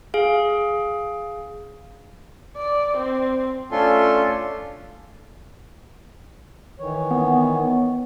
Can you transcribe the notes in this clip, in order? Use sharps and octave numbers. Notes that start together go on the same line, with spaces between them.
G#4 F5
D5
C4
A3 C#4 D4 F4 A4 C6
D#3 E3 C#5
B3